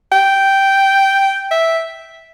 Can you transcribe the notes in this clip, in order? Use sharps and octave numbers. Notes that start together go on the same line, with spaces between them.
G5
E5